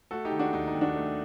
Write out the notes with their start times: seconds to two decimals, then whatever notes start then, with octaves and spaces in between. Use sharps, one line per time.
0.11 A3 F#4 A4
0.25 D#4 G4
0.32 D#3
0.39 D4 F#4
0.53 D#2 D#4
0.67 D#4
0.74 D#2
0.81 D4 F#4
0.96 A3